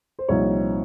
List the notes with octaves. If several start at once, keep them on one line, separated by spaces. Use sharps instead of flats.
C5
C2 A#2 F3 C4 D#4 C#5